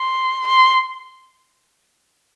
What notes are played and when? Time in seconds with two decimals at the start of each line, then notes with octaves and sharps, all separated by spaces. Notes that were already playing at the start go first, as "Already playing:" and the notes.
Already playing: C6
0.47 C6